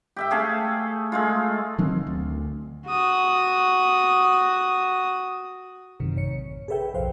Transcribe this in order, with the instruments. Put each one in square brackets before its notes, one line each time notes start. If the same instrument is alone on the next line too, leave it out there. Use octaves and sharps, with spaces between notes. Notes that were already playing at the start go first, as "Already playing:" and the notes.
[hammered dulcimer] G4 E5 G5
A3 G#4 A4 F5
G#3 A3 F4
[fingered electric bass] D#3 F#3 C4
D2
[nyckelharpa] F#4 D#6
[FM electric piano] A1 F#2 C3 D#3
A1 C#5 C#7
G#4 A4 B4 E5 G5
B1 F2 C5 F5 G5